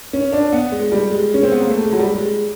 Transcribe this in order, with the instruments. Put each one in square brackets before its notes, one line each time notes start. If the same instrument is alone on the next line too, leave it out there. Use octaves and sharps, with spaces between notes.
[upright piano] C#4
D4
B3
G#3
G3
G#3
C#4
C4
B3
A#3
A3
G#3
F#3
G3
G#3